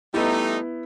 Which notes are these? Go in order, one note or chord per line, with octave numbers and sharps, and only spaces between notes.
G3 A3 B3 D#4 E4